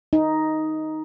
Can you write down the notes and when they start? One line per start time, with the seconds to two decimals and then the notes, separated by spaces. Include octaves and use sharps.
0.13 D#4